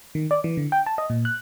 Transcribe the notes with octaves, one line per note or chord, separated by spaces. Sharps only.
D#3
D5
E3
D3
G5
A5
D#5
A#2
F#6